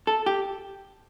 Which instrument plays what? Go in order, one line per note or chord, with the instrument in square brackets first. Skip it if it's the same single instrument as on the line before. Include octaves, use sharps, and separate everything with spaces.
[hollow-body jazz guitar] A4
G4